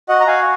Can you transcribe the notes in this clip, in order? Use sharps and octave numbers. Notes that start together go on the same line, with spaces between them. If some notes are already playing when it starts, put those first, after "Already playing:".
F#4 D#5 F#5
A#5
F#4 F5 G#5